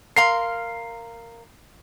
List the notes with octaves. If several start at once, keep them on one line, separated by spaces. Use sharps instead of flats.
A#4 F5 C6 C7